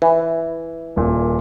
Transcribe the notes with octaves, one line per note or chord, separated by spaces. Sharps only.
E3
D#1 A#2